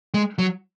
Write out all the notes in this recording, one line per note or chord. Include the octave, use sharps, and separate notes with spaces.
G#3
F#3